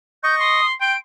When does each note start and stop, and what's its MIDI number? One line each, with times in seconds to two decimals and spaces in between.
0.23 0.61 75
0.23 0.61 85
0.23 0.35 91
0.40 0.73 84
0.40 0.66 87
0.81 0.94 79
0.81 0.96 84
0.81 0.98 98